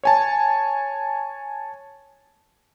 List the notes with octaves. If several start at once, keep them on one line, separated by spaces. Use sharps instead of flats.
C#5 G#5 A5